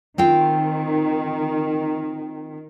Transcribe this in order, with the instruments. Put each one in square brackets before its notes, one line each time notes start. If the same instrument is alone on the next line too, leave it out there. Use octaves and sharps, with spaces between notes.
[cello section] D#3 [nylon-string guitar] C4 F4 G5